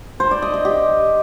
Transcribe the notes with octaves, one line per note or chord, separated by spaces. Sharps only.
C5
D5
D#5
D#5
G4